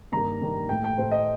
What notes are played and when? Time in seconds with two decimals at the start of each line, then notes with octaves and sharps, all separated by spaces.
0.12 G2 D#3 A#3 A#5
0.41 G2 D#3 A#3
0.69 A2 A3 G5
0.84 G5
0.98 A2 A3 C5
1.11 D#5